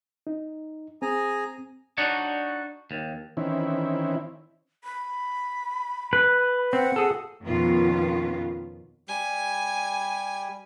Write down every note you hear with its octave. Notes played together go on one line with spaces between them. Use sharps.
D#4
C4 G#4 G#5 A#5
D4 D#4 F#4 C#5
D#2
D#3 E3 C4 C#4 E4
B5
B4
C4 F#5
G#4 A4
F2 B2 D#3 B3 C#4 F4
G3 G#5